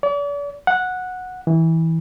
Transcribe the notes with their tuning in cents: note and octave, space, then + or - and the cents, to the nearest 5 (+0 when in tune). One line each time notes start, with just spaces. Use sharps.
D5 -40
F#5 -10
E3 -20